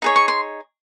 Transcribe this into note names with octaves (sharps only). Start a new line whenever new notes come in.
D#4 G#4 C#5
C#6
C6